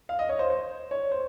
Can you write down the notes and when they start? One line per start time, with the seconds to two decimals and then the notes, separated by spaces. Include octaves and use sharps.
0.09 F5
0.19 D#5
0.29 C#5
0.39 C5
0.50 C5
0.91 C#5
1.12 C5